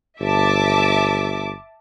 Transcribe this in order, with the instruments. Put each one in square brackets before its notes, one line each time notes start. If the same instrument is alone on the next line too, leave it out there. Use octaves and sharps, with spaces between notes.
[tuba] G1 [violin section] E5 A5 D6